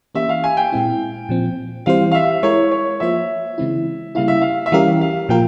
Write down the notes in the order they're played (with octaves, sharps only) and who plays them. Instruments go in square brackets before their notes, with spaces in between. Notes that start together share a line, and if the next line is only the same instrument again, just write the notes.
[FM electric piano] E3 A#3 C#4 G4 [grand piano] E5
[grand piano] F5
G#5
G5
[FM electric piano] A#2 G#3 C4 E4
A#2 F3 C4
[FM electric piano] E3 G3 C4 G4 C5 [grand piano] F5
[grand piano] F5
E5
[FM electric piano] G#3 E4 A#4 [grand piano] C#5
[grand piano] C#5
[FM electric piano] F3 A#3 F4 C5 [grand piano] E5
[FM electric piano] C#3 E3 G#3 C4 E4
[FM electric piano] C#3 G3 A#3 E4 [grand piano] F5
[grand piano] E5
F5
E5
[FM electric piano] E3 G3 C#4 G4 A#4 [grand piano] F5
[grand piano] F5
[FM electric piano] A#2 F3 A#3 F4 A#4 [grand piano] G5